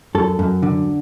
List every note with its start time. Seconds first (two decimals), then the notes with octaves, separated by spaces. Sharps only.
0.15 F#2 A4
0.39 F#2
0.62 D3